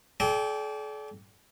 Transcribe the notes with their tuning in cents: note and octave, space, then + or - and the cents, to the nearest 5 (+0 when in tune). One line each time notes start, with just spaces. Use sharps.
A4 -45 D5 -25 G5 +0